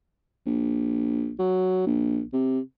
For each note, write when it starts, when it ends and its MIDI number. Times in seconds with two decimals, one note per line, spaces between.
0.46 1.33 34
1.39 1.83 54
1.86 2.22 34
2.33 2.59 48